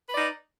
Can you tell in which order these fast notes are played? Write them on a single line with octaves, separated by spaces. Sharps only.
B4 D5 D#4